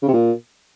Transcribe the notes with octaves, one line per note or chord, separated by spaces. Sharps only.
C#3
C3
A#2